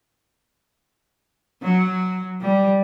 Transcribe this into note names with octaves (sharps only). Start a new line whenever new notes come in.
F#3
G3